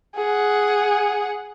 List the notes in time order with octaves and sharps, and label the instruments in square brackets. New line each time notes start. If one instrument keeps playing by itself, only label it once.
[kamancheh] G#4 F#5